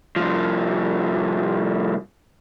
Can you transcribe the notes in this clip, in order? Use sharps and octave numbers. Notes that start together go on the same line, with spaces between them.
C2 F3